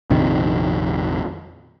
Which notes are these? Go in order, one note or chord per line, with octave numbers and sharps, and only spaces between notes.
A#1 F2 C3 D#3